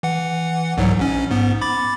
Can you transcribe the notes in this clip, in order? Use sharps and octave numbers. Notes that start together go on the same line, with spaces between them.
E3 F#5
C2 G#2 F#3
A#1 C#4
G#2 B3
B5 D6 A6